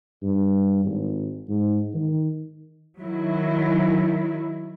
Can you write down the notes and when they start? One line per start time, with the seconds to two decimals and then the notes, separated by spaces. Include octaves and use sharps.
0.23 G2
0.85 G#1
1.49 G#2
1.94 D#3
3.01 D#3 F#3 E4